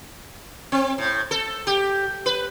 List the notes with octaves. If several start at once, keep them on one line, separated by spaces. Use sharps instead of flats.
C4
A2
A4
G4
B4